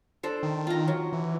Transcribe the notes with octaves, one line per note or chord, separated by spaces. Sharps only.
D4 A4 C5
D#3
F4 A#5
F#3
E3